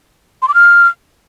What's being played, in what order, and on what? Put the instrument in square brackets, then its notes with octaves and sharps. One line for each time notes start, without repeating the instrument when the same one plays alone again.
[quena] C6
D6
F6